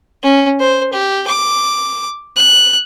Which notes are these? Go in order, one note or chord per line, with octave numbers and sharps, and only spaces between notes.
C#4
C5
G4
D6
F#6